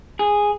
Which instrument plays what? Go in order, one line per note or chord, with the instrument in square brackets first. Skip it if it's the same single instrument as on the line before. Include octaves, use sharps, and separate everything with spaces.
[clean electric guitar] G#4